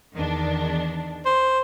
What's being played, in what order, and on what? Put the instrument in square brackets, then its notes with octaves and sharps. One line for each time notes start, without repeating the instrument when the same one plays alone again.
[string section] E2 D#3 D4
[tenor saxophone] C5